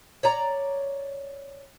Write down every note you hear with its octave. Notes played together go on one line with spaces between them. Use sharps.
C#5 D5 A#5